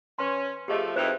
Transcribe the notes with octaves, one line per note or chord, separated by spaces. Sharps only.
C#4 B4 C6
F3 A3 G4 G#4 D#5
F2 D#4 E4 B4 C5